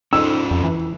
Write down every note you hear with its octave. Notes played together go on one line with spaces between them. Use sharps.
C#4 D#4 F4 C5 E6
F2
E3